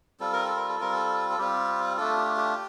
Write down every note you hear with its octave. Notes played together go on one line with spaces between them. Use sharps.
G3 C4 F4 A4
A#4
A4
A#4
A4
G3 C4 F4 A#4
A4
A4
G3 C4 F4 G4
A3 D4 F4 A4
G4
G4